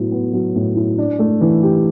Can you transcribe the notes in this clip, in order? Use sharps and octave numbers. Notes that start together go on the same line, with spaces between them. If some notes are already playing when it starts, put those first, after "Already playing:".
Already playing: A2 F#3 B3 E4
B3
F#3
A2
E4
D4
A3
E3
G4